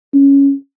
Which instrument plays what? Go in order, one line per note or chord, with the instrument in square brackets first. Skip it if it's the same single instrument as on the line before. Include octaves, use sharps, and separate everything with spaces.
[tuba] C#4